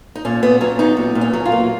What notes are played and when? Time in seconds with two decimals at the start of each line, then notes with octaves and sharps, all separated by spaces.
0.15 D#4
0.25 A#2 C#4
0.43 A#2 B3
0.61 F#3 C#4
0.79 B3 D#4
0.97 A#2
1.15 A#2
1.21 C#4
1.33 F#3
1.45 F4
1.52 A#3